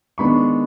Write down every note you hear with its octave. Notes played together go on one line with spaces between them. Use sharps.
D#3 G#3 B3 D4 B5 C#6